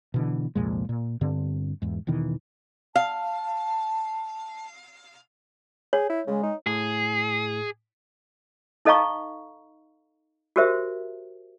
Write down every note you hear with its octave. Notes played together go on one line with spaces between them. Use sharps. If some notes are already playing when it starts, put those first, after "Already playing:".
B2 D3 E3
C2 F2 A#2 G#3
A#2
G2 D3 C4
E2 G#2
E1 B2 D#3 E3
F5 A5
G#4 C#5
E4
C#3 G#3
D#4
A2 G#4
D#4 A4 D#5 F5 A#5 C#6
F#4 G4 A#4 C5 E5